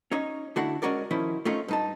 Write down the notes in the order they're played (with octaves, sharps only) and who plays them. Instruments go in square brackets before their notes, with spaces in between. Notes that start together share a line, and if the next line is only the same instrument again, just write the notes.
[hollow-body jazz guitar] C#4 D#4 C#5
D3 A3 D4 E4 F#4 F#5
G#3 A3 C#4 F#4 A#4 D5
D#3 F3 C#4 E4
A3 C4 C#4 D#4 F4
G2 D#4 A5